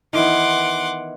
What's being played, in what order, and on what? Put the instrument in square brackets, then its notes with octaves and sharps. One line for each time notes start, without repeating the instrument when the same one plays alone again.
[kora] D#3 E3 B3 [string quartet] F#5 C6 D6